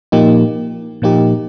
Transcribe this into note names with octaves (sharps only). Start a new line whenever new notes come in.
A#2 F3 A#3 D#4 G4
A#2 F3 A#3 D#4 G4